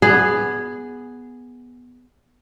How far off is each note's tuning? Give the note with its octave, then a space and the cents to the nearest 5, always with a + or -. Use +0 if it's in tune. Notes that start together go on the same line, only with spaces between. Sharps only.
B3 +0 G#4 +0 D5 +35